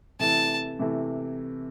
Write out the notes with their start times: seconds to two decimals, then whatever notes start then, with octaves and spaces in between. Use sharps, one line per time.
0.19 C3 E3 A3 E4 A5
0.79 C3 E3 A3 E4